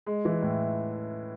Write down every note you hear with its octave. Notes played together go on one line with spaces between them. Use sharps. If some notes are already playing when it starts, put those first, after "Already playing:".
G#3
E3
A2